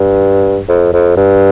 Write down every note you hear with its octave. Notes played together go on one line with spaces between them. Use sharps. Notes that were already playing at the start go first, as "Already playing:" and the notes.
Already playing: G2
F2
F2
G2